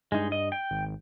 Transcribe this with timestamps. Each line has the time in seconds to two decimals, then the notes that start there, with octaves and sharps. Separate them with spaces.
0.12 G2 G#3 D#4
0.32 D#5
0.52 G5
0.71 G#1